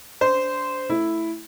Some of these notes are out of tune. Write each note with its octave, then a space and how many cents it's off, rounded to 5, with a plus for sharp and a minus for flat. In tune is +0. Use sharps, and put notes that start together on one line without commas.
D4 -25 C5 -15
A3 +0 E4 +0